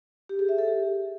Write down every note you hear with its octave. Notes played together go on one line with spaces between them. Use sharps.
G4
G#4
E5
A4
G4